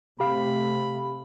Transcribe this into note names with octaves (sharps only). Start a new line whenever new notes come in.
C3 A3 G4 F5 B5